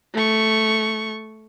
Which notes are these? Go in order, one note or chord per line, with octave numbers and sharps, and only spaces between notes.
A3 C#6